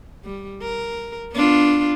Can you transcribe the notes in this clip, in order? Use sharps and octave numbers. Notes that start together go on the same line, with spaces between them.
G3
A#4
B3 D4 F4